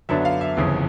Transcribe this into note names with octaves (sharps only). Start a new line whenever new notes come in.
F#2 D3 F#3 B3 D4 E5
F5
E5
G1 F2 C#3 E3